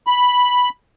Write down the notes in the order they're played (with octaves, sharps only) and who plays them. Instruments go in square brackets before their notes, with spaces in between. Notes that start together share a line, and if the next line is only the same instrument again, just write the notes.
[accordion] B5